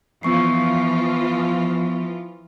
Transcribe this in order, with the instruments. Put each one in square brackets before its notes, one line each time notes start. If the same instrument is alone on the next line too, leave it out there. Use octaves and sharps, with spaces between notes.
[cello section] E3 F3 F4 [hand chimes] B3 C#6 C7